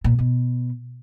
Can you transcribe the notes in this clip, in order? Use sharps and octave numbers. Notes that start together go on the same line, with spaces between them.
A#2
B2